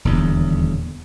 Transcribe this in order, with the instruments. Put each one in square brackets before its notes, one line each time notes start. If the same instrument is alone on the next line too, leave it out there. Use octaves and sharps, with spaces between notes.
[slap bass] D#1 E2 D3